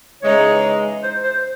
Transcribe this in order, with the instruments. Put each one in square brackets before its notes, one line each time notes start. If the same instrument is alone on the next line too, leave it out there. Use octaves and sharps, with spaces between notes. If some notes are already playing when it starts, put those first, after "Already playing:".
[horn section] C#3 E3 G#3 D#4 [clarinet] C#5
[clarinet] C5
C5